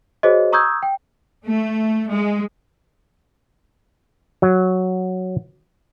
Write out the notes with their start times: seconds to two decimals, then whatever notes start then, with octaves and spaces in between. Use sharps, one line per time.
0.23 F#4 G#4 C5 C#5 D#5
0.52 A#5 C#6 D#6 E6 G6 G#6
0.83 G5
1.45 A3
2.09 G#3
4.42 F#3